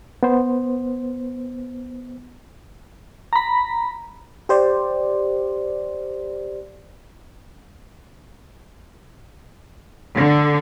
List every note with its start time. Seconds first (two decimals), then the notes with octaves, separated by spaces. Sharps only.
0.23 B3 C5
3.33 A#5 B5
4.49 G4 C5 D5
10.15 D3